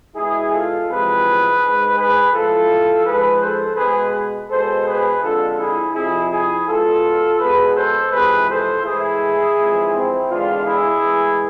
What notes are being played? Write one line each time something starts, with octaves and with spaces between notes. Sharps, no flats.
B2 G#3 E4 G#4
F4 A4
E2 C3 F3 G#3 G#4 B4
G#2 G#3
G#4 B4
A2 F3 G#3 F4 A4
G#2 F3 G#3 G#4 B4
A4 C5
B2 G#3 G#4 B4
B2 G#3 A4 C5
G#4 B4
F2 D3 G#3 F4 A4
E4 G#4
F2 C3 F3 E4 G#4
E4 G#4
B2 G#3 F4 A4
B2 G#3 G#4 B4
A4 C5
F2 C3 E3 G#3 G#4 B4
A4 C5
A2 E3 G#3 E4 G#4
F2 E3 G#3
C4 E4
E2 D3 G#3 D4 F4
E4 G#4
A2 E3 G#3